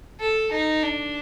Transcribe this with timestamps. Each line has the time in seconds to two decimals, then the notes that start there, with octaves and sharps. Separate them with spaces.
0.20 A4
0.52 D#4
0.83 D4